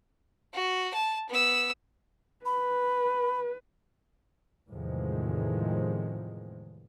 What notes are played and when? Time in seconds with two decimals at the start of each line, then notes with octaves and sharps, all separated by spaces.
0.53 F#4
0.94 A5
1.29 B3 E6
2.46 B4 B5
4.69 E2 A2 C3 D#3 F3 G#3